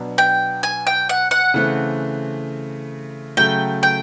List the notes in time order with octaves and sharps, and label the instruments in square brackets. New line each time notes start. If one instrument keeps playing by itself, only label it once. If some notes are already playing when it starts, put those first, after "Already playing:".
Already playing: [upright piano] B2 F#3 B3 D4
[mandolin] G5
G#5
G5
F#5
F#5
[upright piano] C#3 E3 A3 C4
[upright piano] C#3 F#3 A3 [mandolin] G5
[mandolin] G5